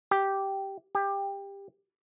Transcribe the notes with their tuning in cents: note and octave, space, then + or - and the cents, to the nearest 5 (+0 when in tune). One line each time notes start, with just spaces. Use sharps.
G4 -5
G4 +20